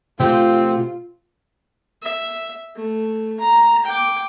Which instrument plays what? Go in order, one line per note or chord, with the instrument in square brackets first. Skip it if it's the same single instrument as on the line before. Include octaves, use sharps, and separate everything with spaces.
[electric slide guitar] B2 A3 G4 [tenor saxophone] C4 [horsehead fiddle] F4
[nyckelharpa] E5
A3
A#5
G5 D6